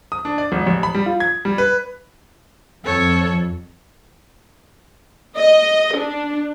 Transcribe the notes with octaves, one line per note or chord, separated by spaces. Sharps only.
D#6
D4
D5
G#1
A1
B5
G3
F4
G#6
G3
B4
F2 A4 C#5
D#5
D4